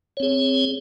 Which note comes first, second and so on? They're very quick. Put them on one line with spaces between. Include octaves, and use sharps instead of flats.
C#5 C4 G#4